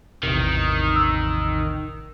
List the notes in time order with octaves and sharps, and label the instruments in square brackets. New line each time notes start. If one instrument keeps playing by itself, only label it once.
[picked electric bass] A1 E2 C3 [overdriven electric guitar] D#3
[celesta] E6